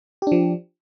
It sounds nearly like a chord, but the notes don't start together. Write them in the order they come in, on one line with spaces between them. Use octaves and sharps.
G4 D4 F3